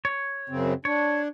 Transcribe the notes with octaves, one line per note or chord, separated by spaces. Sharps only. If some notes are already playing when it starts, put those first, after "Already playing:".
C#5
F#2 C#3 C4
D4 C#5